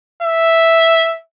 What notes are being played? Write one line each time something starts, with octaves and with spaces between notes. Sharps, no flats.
E5